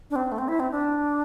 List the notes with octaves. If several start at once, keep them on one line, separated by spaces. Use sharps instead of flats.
D4
C4
A3
C4
E4
C4
D4